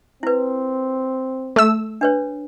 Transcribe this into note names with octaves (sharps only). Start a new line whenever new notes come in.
C4 E4 B4
A3 E6
D4 B4 C#5